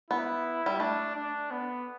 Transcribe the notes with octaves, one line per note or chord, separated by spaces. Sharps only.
B3 E4
G3
A3 D4
D4
B3